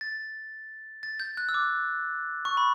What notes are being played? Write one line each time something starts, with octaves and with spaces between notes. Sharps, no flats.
A6
A6
G6
F#6
E6
D6
C#6
B5